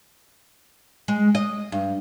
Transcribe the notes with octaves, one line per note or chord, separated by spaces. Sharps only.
G#3
D#5
G2